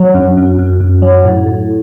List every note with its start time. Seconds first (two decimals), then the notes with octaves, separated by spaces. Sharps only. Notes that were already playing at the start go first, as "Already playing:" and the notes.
Already playing: F#3
0.14 F#2
0.37 F#2
0.59 F#2
0.80 F#2
1.02 F#3
1.25 A2
1.46 A2